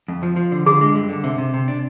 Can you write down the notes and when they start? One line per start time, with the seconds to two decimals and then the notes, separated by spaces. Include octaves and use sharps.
0.08 F2
0.23 F3
0.36 F3
0.52 D3
0.66 D3 G#4
0.81 G#3
0.95 G2
1.09 D3
1.24 C3
1.38 C3
1.54 C3
1.68 D4